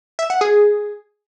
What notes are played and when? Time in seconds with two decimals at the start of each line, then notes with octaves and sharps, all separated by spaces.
0.19 E5
0.30 F#5
0.41 G#4